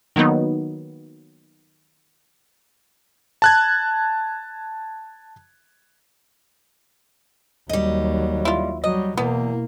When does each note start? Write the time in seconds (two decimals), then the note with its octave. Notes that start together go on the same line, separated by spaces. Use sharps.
0.16 D#3 F#3 A#3 B3 D#4
3.42 A5 F#6 G#6
7.69 D#2 F#3 G3 D#5
8.45 E4 F4
8.84 F#3 G3 D#5
9.17 E2 B2 A#3 B3